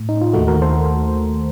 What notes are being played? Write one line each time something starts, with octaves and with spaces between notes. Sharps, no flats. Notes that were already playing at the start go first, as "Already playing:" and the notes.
Already playing: A2
D#4
F4
D#2 D#3 A3 D#4 F#4
F#4 A#4
A4 C5